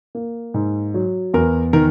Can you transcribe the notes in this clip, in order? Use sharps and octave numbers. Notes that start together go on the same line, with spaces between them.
A#3
G#2
F#3
E2 A#4
D#3 A#4